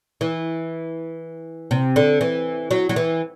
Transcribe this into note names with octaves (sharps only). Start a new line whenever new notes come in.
E3
C3
D3
E3
F#3
F#3
E3